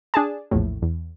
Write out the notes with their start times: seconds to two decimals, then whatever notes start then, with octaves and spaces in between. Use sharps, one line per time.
0.14 D4 G#4 A5
0.51 A#1 E2 A2
0.82 E2